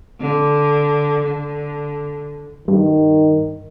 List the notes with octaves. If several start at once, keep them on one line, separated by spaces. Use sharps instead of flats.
D3
D3
G2 D#3